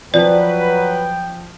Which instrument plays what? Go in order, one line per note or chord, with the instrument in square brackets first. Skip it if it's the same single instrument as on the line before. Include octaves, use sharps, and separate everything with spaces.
[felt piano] F3 [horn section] F#3 B4 [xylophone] D5 [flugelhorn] G5